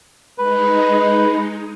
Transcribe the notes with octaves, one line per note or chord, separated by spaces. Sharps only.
G#3 D#4 B4